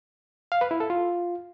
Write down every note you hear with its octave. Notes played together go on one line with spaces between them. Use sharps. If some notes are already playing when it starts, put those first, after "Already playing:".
F5
B4
E4
A4
F4